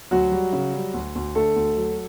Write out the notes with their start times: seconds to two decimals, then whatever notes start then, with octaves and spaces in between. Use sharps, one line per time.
0.11 D2 F#3 F#4
0.32 G3
0.53 C#3
0.73 G3
0.94 D2
1.15 D2
1.35 D3 A3 A4
1.56 D2
1.77 F#3